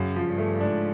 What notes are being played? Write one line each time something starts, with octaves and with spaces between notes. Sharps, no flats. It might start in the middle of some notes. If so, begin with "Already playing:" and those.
Already playing: F#2 C#3
F3
G2
A3
G#2 D4